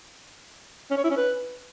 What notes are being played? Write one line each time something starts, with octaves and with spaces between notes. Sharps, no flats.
C#4
C#5
E4
C#4
B4